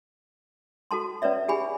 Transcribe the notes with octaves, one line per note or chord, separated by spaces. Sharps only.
F#4 A4 A5 C6
C#4 B4 C#5 D5 E5
G4 G#4 G#5 B5